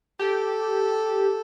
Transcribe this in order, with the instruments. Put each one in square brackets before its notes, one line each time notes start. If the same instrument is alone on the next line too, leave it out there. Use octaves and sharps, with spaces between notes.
[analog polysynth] G4 [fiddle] A4